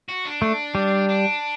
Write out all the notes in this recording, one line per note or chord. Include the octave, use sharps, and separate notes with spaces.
F#4
D4
A3
G3
D4